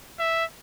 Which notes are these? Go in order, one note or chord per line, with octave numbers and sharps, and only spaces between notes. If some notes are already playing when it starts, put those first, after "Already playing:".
E5